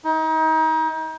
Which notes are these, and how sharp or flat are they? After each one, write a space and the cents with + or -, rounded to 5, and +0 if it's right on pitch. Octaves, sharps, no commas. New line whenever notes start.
D#4 +30